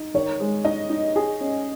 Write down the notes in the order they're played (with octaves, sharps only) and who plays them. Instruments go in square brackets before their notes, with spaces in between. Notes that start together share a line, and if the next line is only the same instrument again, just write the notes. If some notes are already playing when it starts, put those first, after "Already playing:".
Already playing: [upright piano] D#4
[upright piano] D#3 [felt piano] C#5
[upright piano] G#3
[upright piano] D#4 [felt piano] D#5
[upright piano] D#4
G#4
C#4